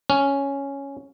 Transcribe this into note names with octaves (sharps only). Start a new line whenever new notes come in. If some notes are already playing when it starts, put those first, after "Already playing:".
C#4